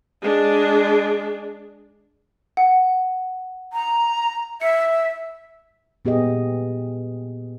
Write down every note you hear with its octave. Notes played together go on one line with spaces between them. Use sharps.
G#3 D4
F#5
A#5
E5 C#7
A#2 B3 G4 G#4 D#5